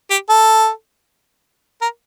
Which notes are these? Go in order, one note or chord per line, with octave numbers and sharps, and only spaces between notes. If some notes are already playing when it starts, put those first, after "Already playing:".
G4
A4
A#4